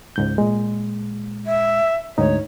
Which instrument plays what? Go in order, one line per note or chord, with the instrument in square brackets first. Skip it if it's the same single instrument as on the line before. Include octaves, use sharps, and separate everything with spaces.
[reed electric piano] C#2 G#2 G6
A#2 G#3
[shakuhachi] E5
[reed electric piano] D2 G#2 D#4 [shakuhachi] C#5